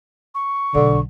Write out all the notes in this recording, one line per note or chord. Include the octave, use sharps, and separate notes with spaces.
C#6
B1 D3